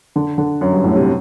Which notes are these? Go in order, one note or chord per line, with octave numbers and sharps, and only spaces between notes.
D3
D3
F#2
G2
A2
C3